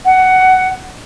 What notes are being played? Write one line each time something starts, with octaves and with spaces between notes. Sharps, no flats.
F#5